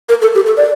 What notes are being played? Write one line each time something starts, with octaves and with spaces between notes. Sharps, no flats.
A#4
A4
G4
A4
D5